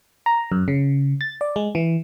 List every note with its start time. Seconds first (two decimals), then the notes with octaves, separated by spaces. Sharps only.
0.26 A#5
0.52 F#2
0.68 C#3
1.21 A6
1.41 D5
1.56 G#3
1.75 E3